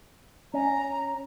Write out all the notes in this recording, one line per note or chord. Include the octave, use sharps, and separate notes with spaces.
C#4 A#5